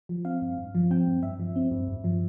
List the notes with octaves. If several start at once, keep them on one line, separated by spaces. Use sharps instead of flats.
F3
C4 F5
G2
G2
F3
C4 G5
G2
G2 E5
F3
C4
G2
G2
F3